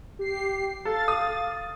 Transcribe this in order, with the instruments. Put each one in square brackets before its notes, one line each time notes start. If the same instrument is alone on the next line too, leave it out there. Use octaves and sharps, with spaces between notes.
[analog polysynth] G4 C7
[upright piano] A4 [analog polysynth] F5 A6
[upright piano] D#6